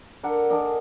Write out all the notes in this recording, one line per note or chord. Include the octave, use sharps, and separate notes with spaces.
D4 A4 A#4 F#5
D4 A#4 D#5 G#5